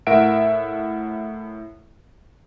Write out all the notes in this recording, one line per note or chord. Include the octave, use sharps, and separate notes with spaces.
A2 A#4 E5 F#5 D7